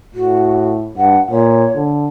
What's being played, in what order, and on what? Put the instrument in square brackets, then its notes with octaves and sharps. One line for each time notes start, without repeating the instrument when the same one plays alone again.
[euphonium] A2 [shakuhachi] F#4
[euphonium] G2 [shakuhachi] F#5
[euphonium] A#2 [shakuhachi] C#5
[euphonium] D3